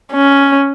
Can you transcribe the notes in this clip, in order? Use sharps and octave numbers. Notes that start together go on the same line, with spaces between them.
C#4